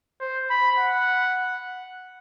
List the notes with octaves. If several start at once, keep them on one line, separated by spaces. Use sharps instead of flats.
C5
B5
F#5